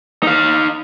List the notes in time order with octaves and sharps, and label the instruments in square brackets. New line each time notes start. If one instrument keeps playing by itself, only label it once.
[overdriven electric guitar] D#4 F5